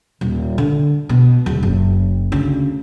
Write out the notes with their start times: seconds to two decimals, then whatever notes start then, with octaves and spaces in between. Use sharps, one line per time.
0.21 D#1
0.58 D3
1.09 B2
1.46 D1
1.63 F#1
2.32 D2 C#3